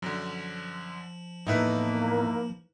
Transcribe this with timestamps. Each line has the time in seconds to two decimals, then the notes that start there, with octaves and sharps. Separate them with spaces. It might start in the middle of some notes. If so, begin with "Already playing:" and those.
0.02 F#2 D3 F3
1.47 E2 A2 A#3 D#4 E4 B4